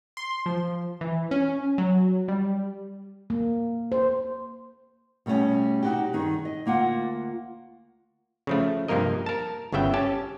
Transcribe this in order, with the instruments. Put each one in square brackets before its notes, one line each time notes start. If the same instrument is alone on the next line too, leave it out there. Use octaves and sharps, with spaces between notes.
[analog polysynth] C6
F3
E3
C#4
F#3
G3
[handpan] A#3
C5
[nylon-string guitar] B2 G3 A3 C#4 G4
D#4 F#4 G4
G2 D#3 D#4 G#4
D#5
D2 A#3 F4 F#5
[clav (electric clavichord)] C#3 F3 A3
G2 C3 F3 A#3 A#4 D#5
A#4 A5
G1 C#3 B3 E5 G5
C#4 G4 A5